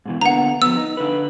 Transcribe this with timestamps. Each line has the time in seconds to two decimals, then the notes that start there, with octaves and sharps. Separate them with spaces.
0.06 G#2 B2 E3
0.21 D3 A#3 B3 F#5 A#5
0.62 F3 B3 E6
0.77 D#4
0.97 D3 B4